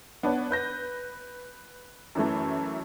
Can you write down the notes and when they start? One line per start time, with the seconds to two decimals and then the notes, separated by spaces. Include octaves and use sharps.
0.23 B3 D4 C#5
0.51 B4 G6 A#6
2.15 F#2 E3 A3